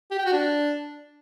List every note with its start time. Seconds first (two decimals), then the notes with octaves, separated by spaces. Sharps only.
0.11 G4
0.18 G5
0.26 F#4
0.33 D4